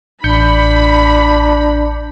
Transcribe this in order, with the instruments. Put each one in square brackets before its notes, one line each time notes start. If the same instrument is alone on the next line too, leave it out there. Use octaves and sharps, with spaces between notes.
[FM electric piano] A1 G6 C#7 [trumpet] D4 [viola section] B5